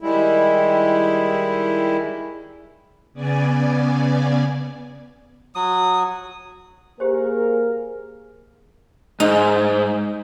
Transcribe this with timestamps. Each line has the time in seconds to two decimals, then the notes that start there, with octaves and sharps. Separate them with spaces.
0.01 D#3 G3 G#3 E4
3.13 C#3 B3 D5 G#5
5.55 F#3 D#6
7.00 A#3 G4 G#4 A#4 C5
9.20 G#2 D#4